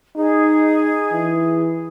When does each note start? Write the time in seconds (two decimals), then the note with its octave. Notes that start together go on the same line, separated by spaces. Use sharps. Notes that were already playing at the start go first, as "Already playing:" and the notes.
0.16 D#4 G#4
1.12 E3